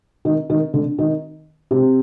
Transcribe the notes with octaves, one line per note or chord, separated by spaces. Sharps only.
D#3
D#3
D3
D#3
C3